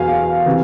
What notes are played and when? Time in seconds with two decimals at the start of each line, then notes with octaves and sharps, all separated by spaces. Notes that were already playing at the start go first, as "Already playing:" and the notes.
Already playing: E2 B2 F#3 F5 G#5
0.46 C3 E3